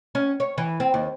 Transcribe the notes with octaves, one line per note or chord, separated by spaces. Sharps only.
C#4
C#5
E3
C4
D#2